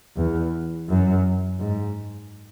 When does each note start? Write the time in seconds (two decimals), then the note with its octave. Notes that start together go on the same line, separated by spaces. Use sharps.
0.17 E2
0.89 F#2
1.59 G#2